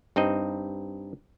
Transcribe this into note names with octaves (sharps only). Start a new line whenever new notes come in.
G2 C4 D#4 D#5